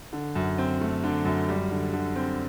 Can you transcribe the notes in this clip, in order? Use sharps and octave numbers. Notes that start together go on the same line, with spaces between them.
D3
F#2
C4
A3
D3
F#2
G3
D3
D3
C4